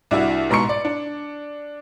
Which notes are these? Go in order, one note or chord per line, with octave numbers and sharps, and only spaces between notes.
C2 D4 E4 F#4 E5
G#2 B2 A#5 C6 C#6 C#7
D5
D4